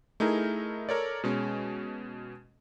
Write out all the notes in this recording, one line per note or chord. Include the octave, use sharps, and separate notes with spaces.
A3 D#4 E4 G#4 A#4
A4 A#4 C#5 D5
B2 G#3 C#4